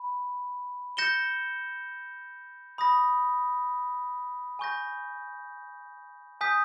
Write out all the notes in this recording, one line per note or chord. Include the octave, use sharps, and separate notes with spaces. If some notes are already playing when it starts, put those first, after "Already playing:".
Already playing: B5
G6 A#6 C#7 E7 G7
B5 D#6 A#6
G#5 C#6 G6 A#6
G#5 D#6 G6 B6